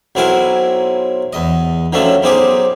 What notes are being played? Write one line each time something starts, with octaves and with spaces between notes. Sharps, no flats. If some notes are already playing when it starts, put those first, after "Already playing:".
B1 F#3 C4 E4 A#4 G#5
E2 D#5
D3 D#3 F3 F#3 A3 C#4
B1 C4 D#4 G4 G#4